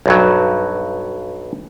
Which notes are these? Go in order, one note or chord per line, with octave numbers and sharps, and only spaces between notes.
B1 G2 F#3